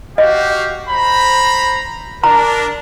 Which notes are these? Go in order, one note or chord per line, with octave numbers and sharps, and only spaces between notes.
F#4 G4 D#5 F5
C5 A#5 B5
D4 A#4 A#5